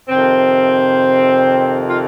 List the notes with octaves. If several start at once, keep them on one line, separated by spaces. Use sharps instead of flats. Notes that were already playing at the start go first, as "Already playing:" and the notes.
F2 C3 D#3 C4
F4